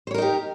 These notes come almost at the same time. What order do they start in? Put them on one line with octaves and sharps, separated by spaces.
C5 C#5 A#4 D#4 G4